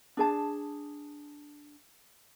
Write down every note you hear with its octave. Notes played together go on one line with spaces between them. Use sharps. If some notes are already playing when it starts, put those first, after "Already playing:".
D4 G#4 A5